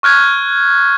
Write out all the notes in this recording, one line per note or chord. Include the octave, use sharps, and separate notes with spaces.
C#6 F6 F#6 G#6